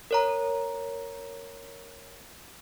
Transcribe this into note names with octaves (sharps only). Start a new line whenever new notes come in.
A#4 C#5 A#5